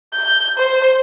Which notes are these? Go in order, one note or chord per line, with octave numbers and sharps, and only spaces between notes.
G6
C5